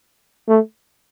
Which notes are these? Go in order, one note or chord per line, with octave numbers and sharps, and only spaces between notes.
A3